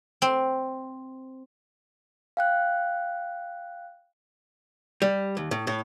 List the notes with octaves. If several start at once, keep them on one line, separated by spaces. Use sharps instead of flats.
C4
F5 G5 F#6
G3
D#2
A2
A2